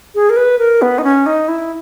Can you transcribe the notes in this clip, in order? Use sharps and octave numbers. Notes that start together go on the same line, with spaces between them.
G#4
A#4
B4
A#4
B3
D#4
C#4
D#4
E4